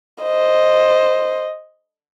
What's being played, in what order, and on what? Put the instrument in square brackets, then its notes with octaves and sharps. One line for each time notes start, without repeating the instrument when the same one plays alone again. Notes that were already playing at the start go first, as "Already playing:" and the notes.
[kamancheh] C5 D#5